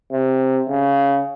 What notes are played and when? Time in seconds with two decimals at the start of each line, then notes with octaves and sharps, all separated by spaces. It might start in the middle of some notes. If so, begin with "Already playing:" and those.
0.12 C3
0.70 C#3